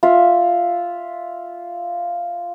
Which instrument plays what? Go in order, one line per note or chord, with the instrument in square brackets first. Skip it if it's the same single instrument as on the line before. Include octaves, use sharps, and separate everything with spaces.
[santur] F4 E5